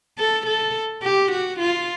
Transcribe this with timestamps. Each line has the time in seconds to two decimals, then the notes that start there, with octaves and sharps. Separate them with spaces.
0.19 A4
0.46 A4
1.02 G4
1.32 F#4
1.59 F4